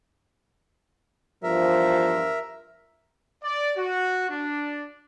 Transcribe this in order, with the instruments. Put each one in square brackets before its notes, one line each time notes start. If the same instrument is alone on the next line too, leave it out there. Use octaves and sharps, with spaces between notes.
[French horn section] E2 G2 F3 [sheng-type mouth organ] A#4 E5
[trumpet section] D5
F#4
D4